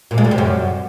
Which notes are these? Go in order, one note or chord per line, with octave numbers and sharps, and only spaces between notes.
A#2
G#3
G3
C3
F#2